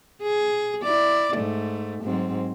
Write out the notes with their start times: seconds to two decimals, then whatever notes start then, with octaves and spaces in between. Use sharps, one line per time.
0.22 G#4
0.83 E4 D5
1.34 G#2 A3
2.03 G#2 F#3 C4